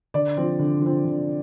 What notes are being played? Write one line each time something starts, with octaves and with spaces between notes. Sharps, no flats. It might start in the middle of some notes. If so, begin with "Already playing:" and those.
D3 D5
F3 C4
D3
F3 C4
D3